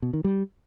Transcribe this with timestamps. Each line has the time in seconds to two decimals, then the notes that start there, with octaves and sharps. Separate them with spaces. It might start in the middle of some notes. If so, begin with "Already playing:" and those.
0.02 B2
0.13 D#3
0.24 G3